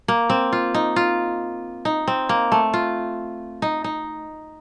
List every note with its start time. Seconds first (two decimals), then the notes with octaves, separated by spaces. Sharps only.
0.08 A#3
0.30 C4
0.53 F4
0.74 D#4
0.96 F4
1.85 D#4
2.08 C4
2.29 A#3
2.52 A3
2.74 F4
3.62 D#4
3.84 D#4